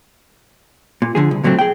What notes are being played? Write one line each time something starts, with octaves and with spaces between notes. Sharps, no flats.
A#2
D3 F3 G#4
C2
C#2 A#2 F#3 A3 C4
G#4 G5